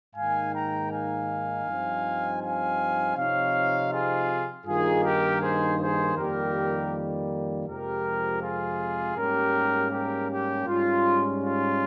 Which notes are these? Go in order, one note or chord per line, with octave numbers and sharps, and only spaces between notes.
G#2 D#3 A#3 D#4 F5 G#5
G5 A#5
F5 G#5
G2 F3 C4 D#4
F5 G#5
C3 F3 C4 D#4 C#5 F5
F4 G#4
G2 D#3 A#3 D#4 F4 G#4
G4 A#4
G#4 C5
G#4 C5
F2 D#3 G3 A#3 G4 A#4
F2 C3 F3 G#3 C4 G4 A#4
F4 G#4
G#2 G3 A#3 C#4 G4 A#4
G4 A#4
G4
G#2 G3 C#4 F4
F4